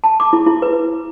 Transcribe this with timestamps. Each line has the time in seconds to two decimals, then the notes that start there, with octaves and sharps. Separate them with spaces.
0.04 A5
0.20 D6
0.33 E4
0.47 E4
0.62 B4